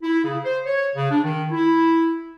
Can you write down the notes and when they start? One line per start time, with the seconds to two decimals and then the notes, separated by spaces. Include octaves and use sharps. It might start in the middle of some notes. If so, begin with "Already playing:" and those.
0.03 E4
0.24 C#3
0.44 C5
0.66 C#5
0.96 C#3
1.11 D4
1.24 D#3
1.51 E4